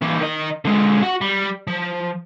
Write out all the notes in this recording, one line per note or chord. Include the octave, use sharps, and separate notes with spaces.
E3 A#3
D#3 D#5
D3 G#3
F#4 F#5
G3
F3